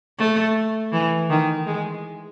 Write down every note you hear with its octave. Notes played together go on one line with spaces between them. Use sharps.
A3
E3
D#3
G#3